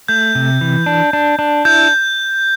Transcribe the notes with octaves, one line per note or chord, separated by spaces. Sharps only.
A3 G6
C3
E3
D4
D4
D4
E4 G6